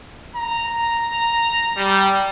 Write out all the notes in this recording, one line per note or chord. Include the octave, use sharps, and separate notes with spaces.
A#5
G3